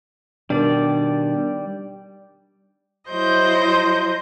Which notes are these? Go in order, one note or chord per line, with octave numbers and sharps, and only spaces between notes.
B2 D#3 G3 D4 D5
F#3 E4 C5 D#5 G6